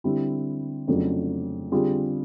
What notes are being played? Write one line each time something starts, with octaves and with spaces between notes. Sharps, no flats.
D3 G3 C4 E4
F2 C#3 F#3 A3 D4
D3 G3 C4 F4 G#4